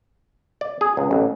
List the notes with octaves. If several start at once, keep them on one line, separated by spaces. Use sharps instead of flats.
D5
G#4
C#2
A1